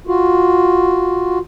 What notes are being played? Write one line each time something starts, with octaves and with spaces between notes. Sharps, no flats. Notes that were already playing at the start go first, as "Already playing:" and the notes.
F4 F#4